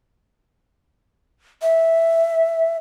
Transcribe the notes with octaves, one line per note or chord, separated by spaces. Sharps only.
E5